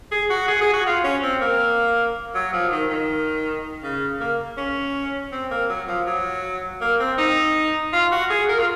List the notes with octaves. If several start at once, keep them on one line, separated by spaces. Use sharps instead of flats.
G#4
F#4
G#4
G#4
F#4
F4
C#4
C4
A#3
F#3
F3
D#3
D#3
C#3
A#3
C#4
C4
A#3
F#3
F3
F#3
A#3
C4
D#4
F4
F#4
G#4
A#4
F4